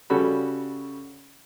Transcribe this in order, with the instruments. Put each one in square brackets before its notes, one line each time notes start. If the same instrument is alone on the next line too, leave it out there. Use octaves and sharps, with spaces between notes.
[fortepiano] C#3 G3 F#4 A4 B5